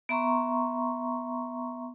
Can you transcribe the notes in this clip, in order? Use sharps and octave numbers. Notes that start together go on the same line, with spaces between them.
B3 E5 A#5 C6 C#6